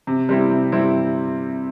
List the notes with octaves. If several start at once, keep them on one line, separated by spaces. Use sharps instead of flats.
C3
G3 C4 E4
C3
G3 C4 E4